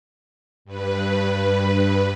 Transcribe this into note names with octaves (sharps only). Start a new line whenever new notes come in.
G2 B4